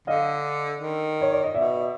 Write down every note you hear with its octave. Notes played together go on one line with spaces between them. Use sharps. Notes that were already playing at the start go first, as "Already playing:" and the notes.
D3 D#5 F5
D#3
C#5
D5
D#5
B2 D5 E5